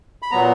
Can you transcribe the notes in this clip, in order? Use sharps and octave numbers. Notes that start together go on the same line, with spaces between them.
B5
A#2 F#3 B3 A#5